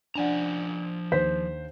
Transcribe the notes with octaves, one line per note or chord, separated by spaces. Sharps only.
F3 D4 D5 F#5 G#5 A#5
D#2 C5 B6